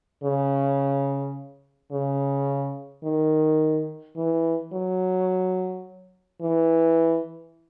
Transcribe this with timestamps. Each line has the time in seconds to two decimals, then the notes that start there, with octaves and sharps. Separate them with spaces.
0.23 C#3
1.91 C#3
3.04 D#3
4.16 E3
4.73 F#3
6.42 E3